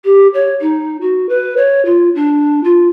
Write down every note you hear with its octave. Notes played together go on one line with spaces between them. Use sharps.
G4
C#5
D#4
F#4
B4
C#5
F4
D4
F4